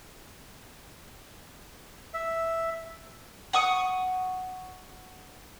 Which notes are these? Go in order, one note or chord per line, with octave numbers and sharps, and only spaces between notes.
E5
F#5 C#6 D#6